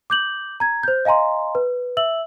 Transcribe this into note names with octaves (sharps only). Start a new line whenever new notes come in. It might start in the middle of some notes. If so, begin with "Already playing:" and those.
D6 G6 F#7
A#5 G#6
C5 G6
D#5 F5 G#5 A#5 C6
B4
E5 E6 F#7